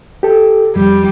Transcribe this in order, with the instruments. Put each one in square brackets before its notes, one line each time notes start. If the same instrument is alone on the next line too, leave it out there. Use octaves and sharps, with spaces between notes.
[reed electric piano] G4 A4
[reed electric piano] F2 [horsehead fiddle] G3